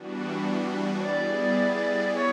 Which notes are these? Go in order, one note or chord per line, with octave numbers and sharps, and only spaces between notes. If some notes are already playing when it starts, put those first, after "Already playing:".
Already playing: E3 G3 B3 D4 F#4
C#5
G3 B3 E4 G#4 D5
C#5